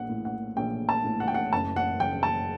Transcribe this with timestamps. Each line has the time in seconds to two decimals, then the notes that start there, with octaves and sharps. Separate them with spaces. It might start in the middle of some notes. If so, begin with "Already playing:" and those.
Already playing: A#1 F#5
0.09 A2
0.25 F#5
0.57 A#1 G5
0.89 A5
1.04 A2
1.20 F#5
1.28 G5
1.34 F#5
1.53 F#1 A5
1.76 F#5
2.00 F#1 G5
2.23 A5